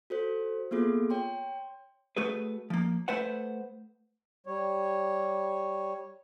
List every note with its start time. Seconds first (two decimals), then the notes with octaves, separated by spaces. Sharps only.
0.10 F#4 A4 C5
0.71 A#3 B3 F4 G#4 A4
1.10 C#5 G5 C6
2.17 A3 F#4 G#4 B4
2.70 F3 A#3
3.08 A3 B4 C5 F#5
4.47 G3 C#5